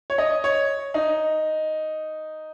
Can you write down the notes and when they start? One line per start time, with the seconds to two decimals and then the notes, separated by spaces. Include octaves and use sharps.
0.10 C#5
0.18 D#5
0.44 C#5
0.94 D#4